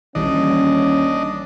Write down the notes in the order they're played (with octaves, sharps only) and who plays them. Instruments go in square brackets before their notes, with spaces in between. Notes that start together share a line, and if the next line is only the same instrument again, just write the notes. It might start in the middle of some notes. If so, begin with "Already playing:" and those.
[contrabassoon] D#1 [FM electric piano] A#1 E3 G3 [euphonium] C#4 [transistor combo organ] D4 D#5